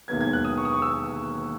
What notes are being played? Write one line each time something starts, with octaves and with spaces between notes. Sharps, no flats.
E1 D#2 D#3 F#3 B3 G#6
G#6
F#6
D#6
C#6
D#6
C#6
E6